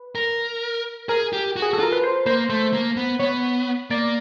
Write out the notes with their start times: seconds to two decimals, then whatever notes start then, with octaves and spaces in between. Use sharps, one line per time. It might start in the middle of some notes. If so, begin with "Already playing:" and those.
Already playing: B4
0.15 A#4
1.09 G#4 A#4
1.33 G4
1.56 F#4
1.62 G#4
1.73 F#4 A4
1.80 F4 A#4
1.92 B4
2.04 C5
2.26 A#3 C5
2.49 A3 C5
2.73 A#3
2.97 B3
3.19 B3 C#5
3.90 A#3 D5